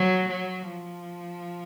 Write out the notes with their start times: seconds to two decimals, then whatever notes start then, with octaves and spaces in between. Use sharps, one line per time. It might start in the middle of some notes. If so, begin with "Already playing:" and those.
Already playing: F#3
0.29 F#3
0.67 F3